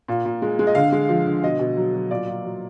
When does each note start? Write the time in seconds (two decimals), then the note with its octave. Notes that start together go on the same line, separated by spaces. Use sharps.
0.08 A#2
0.25 A#2
0.42 G#3
0.59 G#3
0.67 D#5
0.75 D3 F5
0.92 G#3
1.09 F3
1.26 D3
1.42 B2 D#5
1.59 B2
1.77 F#3
1.94 F#3
2.11 A#2 D5
2.27 A#2
2.45 F#3